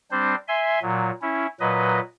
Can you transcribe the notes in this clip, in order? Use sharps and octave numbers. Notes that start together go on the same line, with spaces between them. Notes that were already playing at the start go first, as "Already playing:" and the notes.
G3 C4 D4 C5
E5 G#5 C6
A#2 F#3
C#4 E4
A#2 F#3 B4 D#5